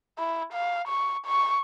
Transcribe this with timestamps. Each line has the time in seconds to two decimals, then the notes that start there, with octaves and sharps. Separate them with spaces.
0.18 E4
0.53 F5
0.88 C#6
1.26 C#6